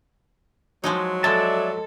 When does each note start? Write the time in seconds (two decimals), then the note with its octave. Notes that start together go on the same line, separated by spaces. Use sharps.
0.84 F3 F#3 G#3 D#4
1.24 G#3 A4 D5 E5 A5